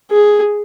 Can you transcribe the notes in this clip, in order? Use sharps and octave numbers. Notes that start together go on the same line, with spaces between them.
G#4